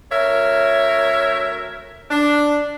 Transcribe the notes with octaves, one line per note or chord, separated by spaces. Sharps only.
D2 A#4 C#5 E5
D4